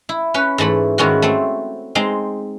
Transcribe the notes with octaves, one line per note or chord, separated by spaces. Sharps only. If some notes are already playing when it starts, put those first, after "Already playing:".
E4
C#4 B4
G#2 E3 A3 B5
G#2 D#3 C#4 E4 F#4
A3 C4
G#3 C4 D#4